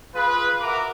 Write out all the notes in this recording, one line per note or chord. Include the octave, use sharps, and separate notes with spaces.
F4 G#4 B4
F#4 A#4 E5 D6